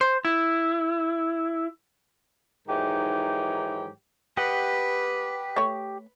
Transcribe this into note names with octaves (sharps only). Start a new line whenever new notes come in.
C5
E4
G#2 D#3 E3 F#3 D#4 G4
G4 B4 D#5 F#5
A3 C#5